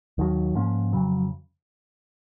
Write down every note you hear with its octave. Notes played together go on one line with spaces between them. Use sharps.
D#2 D#3 F#3
G#2 F3 A#3 C#4
F2 C#3 F#3